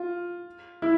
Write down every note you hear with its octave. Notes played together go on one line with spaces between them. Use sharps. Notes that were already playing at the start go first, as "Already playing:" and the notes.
Already playing: F4
E4